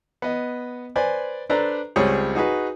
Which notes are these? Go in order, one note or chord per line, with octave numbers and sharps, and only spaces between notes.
B3 D#5
B4 C5 D5 G#5
D4 A4 B4 C5 D5 A#5
C#2 G3 C4 G#4 C#5
D#4 F#4 G#4 B4